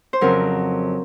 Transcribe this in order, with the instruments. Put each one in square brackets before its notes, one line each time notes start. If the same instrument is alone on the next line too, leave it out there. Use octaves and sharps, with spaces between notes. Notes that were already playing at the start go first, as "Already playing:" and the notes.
[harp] C5
F2 C#3 F#3 A#4